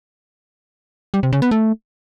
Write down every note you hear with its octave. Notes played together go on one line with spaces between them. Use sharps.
G3
C3
C#3
B3
A3